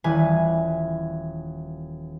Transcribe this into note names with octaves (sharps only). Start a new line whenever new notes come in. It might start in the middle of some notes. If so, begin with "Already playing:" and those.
D#1 E3 B4 G#5